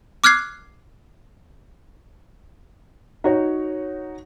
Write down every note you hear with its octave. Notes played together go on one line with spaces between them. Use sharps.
D6 F6 F#6 G#6 C7
D#4 F#4 C#5